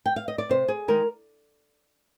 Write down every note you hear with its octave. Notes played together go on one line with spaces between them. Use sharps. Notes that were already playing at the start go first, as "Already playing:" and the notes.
G5
F5
D#5
D5
C3 C5
G#4
D#3 G#3 A#4